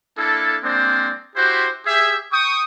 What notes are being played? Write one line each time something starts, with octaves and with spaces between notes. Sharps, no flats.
A#3 D4 E4 A4
G#3 A#3 C4 D4 C5 D5
E4 F#4 G4 C5
G4 G#4 E5
G5 C#6 D#6